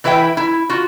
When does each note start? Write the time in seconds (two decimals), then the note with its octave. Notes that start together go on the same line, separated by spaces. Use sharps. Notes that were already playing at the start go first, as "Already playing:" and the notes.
0.04 E3 E4 B4 E5 G5
0.37 E4
0.70 F4 F#4